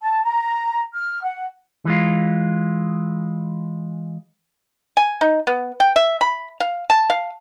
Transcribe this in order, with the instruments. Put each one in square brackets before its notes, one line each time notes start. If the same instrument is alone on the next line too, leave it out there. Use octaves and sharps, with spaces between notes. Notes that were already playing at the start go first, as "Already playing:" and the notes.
[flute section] A5
A#5
F6
F#5
[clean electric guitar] E3 G#3 F4
[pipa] G#5
D#4
B3
G5
E5
B5
F5
A5
F5